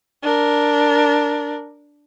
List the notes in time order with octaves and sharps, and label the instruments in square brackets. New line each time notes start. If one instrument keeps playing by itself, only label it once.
[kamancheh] D4 A#4